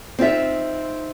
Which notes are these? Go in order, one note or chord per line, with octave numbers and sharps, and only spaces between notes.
C4 D#4 F4 E5